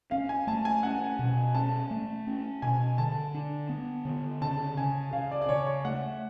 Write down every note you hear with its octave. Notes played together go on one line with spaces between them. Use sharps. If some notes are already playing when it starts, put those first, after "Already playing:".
C#4 F5
G#5
A3 A5
G#5
C#4 F#5
B2
C#4 A5
A3
C#4
B2 G#5
D3 A5
D4
B3
D3
C#3 A5
C#3 G#5
C#3 F5
D5
D5
C#3 C#5
C#5
A3 F#5